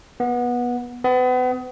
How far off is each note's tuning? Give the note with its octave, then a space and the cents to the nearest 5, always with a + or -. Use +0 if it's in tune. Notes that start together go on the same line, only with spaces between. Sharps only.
B3 -20
B3 +35